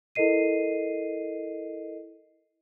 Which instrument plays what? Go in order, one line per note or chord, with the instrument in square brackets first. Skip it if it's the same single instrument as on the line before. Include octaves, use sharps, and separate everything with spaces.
[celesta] E4 A4 A#4 D#5 C7 D#7